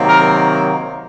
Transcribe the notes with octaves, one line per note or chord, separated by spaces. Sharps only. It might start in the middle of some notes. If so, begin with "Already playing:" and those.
Already playing: C3 D#3 F#3 A#3
A#4